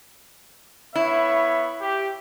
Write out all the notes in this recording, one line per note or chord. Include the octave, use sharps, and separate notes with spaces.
B3 E4 C#5 E5
G4